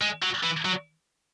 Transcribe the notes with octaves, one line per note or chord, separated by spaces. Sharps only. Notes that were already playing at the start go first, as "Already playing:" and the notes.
G#3
F#3
E3
F#3